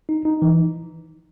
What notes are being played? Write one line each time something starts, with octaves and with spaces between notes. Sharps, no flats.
D#4
D#4
E3